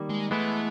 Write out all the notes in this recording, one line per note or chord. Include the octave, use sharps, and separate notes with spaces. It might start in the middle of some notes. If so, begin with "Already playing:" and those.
Already playing: D#3 G3 A#3
G#3
E3 G#3 A3 B3 E4